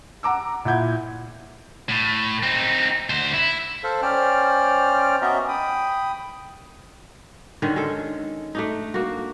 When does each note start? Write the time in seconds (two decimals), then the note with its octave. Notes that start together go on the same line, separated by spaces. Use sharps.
0.23 F#5 A#5 D6 E6
0.65 A#2 E4 F#5 G6 G#6
1.89 A2
2.43 C4 D#4
3.10 D2 C5
3.34 E4
3.84 A4 C5 F5
4.02 C#4 C5 D5 G5 F6
5.22 B3 C#4 F#4 D#5 E5 A#5
5.48 G5 B5 D#6
7.62 D3 D#3 G#3 C#4
7.76 G#3 A4
8.55 A3 D4 D#4
8.94 A#3 F#4